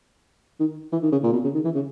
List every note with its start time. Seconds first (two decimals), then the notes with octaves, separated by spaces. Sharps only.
0.60 D#3
0.92 E3
1.03 D#3
1.12 C#3
1.23 A#2
1.33 B2
1.44 C#3
1.54 D#3
1.64 E3
1.75 C#3